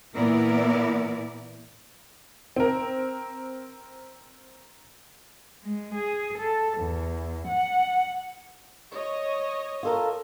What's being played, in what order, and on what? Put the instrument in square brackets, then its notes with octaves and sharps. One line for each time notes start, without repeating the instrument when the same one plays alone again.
[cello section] A#2 E3 B3 E4 A#4 D5
[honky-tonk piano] C4 A#4
[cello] G#3
G#4
A4
E2
F#5
[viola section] C#5 D#5
[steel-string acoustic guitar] F4 A4 A#4